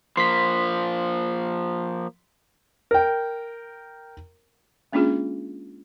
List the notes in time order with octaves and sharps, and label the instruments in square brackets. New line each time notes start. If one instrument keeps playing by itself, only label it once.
[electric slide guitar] F3 A#3 [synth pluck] C6 B6
[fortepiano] A#4 G5
[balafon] G#3 A#3 C#4 D4 F4 G#4